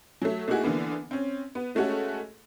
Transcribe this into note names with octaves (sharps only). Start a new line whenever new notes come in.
F#3 A3
A3 A#3 D#4 E4 F#4 G#4
D3 E3 A#3 B3
C4 C#4
B3
G#3 A3 C#4 F#4 A4